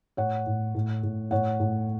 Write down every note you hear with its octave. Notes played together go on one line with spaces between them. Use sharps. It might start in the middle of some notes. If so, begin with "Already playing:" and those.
A2 C#5 F#5
A2
A2
A2
A2 C#5 F#5
A2